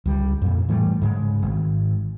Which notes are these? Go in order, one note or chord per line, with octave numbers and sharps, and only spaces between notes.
C#2 G3
F2 A#2
A2 E3 G3 A3
G#2 C#3 G#3
G#1